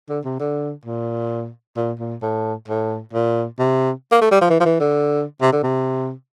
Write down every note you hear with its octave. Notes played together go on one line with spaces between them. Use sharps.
D3
C3
D3
A#2
A#2
A#2
A2
A2
A#2
C3
A#3
A3
G3
F3
E3
F3
E3
D3
C3
D3
C3